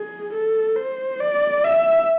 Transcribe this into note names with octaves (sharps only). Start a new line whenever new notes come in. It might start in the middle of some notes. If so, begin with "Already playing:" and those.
Already playing: G#4
A4
C5
D5
E5